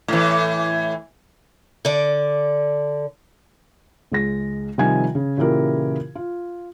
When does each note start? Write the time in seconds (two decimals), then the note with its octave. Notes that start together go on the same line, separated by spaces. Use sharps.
0.08 A2 E3
1.85 D3 D5
4.12 C#2 G#3 A#6
4.78 C3 D#3 F3 G3 G#5 G#6
5.15 C#3
5.37 A#2 C#3 E3 E4 G4 A#4
6.15 F4